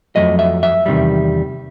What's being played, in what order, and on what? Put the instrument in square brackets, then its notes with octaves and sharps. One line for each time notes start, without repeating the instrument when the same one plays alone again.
[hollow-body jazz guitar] F2 C#3 F#3 A3 D#5
E5
E5
E2 C3 D#3 G3